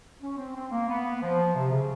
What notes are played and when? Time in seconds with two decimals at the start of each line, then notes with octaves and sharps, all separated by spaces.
0.22 C#4
0.38 C4
0.56 C4
0.71 A#3
0.89 B3
1.22 F3
1.55 C3
1.71 C#3